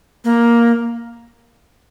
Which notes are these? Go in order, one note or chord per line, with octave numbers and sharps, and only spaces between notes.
A#3